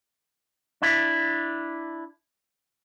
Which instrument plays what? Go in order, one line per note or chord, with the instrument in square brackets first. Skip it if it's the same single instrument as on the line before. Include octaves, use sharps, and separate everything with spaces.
[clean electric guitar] D4 E4